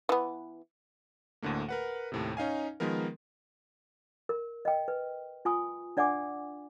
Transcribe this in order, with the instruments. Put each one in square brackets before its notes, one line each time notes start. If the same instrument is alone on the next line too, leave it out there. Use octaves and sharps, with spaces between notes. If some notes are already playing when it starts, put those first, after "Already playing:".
[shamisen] E3 B3
[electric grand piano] D2 A2 D3 A3 A#3
A#4 B4 F#5
D#2 A2 C3
C#4 D#4 F5 G#5
D#3 F3 G#3 B3 A#4
[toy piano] A#4
D#5 G5
B4
F4 G#5 C#6 D#6
D4 D5 F#5 G#5 D6